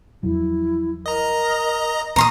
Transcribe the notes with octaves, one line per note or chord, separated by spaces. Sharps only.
E2 F3 F#3 E4
A#4 D#5 A#5
D#1 E3 A#3 A#5 C6 D#6